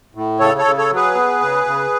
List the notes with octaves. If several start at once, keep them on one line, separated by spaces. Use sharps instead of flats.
A2
C#3 A4 C#5
A4 C#5
C#3
A4 C#5
F#3
G#4 B4
B3
C#3
C#3